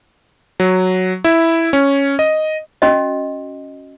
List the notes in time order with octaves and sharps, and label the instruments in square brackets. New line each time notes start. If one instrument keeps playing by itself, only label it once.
[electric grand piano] F#3
E4
C#4
D#5
[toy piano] C#4 F#4 D#5